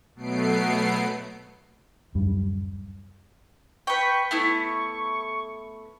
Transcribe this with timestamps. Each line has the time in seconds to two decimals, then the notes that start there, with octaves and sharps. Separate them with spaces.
0.15 B2 F#3 A3 B3 C7 D7
2.14 D1 F#2 G3
3.87 B4 G5 C#6
4.31 A3 B3 E4